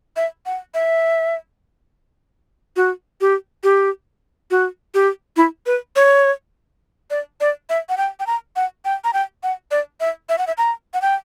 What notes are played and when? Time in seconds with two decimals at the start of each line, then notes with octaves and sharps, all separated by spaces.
0.16 E5
0.46 F#5
0.74 E5
2.76 F#4
3.21 G4
3.64 G4
4.51 F#4
4.94 G4
5.37 E4
5.66 B4
5.96 C#5
7.10 D5
7.41 D5
7.70 E5
7.89 F#5
7.97 G5
8.20 G5
8.27 A#5
8.56 F#5
8.85 G5
9.04 A#5
9.13 G5
9.43 F#5
9.71 D5
10.00 E5
10.29 E5
10.38 F#5
10.47 E5
10.58 A#5
10.94 F#5
11.02 G5